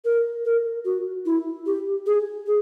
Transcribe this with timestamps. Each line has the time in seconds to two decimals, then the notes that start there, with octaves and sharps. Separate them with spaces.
0.05 A#4
0.45 A#4
0.85 F#4
1.26 E4
1.66 G4
2.06 G#4
2.47 G#4